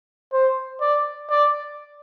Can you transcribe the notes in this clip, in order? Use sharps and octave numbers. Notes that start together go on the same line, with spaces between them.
C5
D5
D5